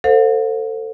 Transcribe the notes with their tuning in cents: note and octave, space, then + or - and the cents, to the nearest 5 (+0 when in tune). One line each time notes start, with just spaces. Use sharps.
A4 +30 C5 +0 F5 +45